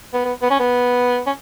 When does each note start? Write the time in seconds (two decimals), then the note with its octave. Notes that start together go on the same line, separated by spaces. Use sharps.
0.14 B3
0.25 B3
0.42 B3
0.50 C#4
0.59 B3
1.26 C#4